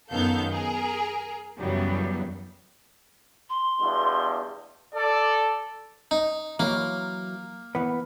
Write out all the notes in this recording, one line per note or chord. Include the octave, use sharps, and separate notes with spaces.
F#2 D#3 B3 A4 F5 G6
G#4 A#4
F#2 C#3 E3 F#3 G3 B3
C6
E2 G2 B2
A4 D5
D#4
E3 F#3 A#3
E3 B3